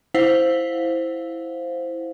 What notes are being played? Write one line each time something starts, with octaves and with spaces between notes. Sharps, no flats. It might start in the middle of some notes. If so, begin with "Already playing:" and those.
E4 C5 F5 F#5